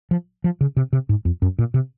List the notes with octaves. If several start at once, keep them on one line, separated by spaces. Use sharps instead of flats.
F3
F3
C#3
C3
C3
G#2
F2
F#2
A#2
C3